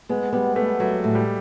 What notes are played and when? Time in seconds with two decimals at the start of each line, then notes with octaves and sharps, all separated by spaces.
0.09 G#3 B3
0.33 G3 B3
0.56 A3 B3
0.80 F#3 A3
1.04 A2
1.15 G3